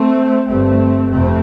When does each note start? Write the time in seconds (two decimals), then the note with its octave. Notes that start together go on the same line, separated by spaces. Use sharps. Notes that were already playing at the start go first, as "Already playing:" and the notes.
Already playing: A3 C4
0.47 G1 G2 A3 C4
1.12 F1 F2 C3 A3 C4